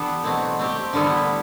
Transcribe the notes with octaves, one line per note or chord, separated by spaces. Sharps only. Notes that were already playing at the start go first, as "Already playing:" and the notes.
Already playing: E3 B3 D4 G4 A4
B2 F#3 A3 C4
A3 C4 G4
D3 G3 B3 E4